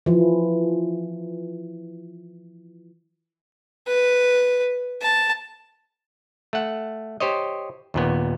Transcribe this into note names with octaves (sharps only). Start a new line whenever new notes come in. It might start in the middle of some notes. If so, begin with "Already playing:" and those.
E3 F3
B4
A5
A3 F#5
G4 C5 C#5 D#5
D#2 A#2 B3